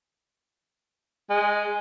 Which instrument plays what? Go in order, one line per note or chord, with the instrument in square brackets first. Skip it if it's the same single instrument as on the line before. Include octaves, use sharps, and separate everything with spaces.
[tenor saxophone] G#3